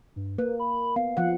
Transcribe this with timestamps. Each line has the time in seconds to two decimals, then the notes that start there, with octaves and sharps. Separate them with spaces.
0.16 G2
0.38 A#3 B4
0.60 B5
0.96 B3 F5
1.17 F3 F#5